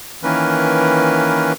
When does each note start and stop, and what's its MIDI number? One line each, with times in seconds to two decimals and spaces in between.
0.23 1.53 51
0.23 1.53 52
0.23 1.53 58
0.23 1.53 61
0.23 1.53 70
0.23 1.53 71